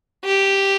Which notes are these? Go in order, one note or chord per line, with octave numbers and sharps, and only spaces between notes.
G4